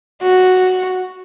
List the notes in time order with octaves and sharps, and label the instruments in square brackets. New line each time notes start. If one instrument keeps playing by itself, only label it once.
[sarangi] F#4